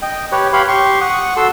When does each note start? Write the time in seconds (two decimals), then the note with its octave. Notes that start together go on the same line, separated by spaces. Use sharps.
0.02 D#5 G5
0.32 G4 B4 C#5
0.53 G4 B4 C#5 F5 B5 C6
0.68 G4 C6 C#6
1.01 F#5 C#6 D#6
1.37 F#4 A4 C6 E6